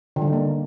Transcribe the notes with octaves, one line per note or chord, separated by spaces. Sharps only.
D3
G3
D#4
A#3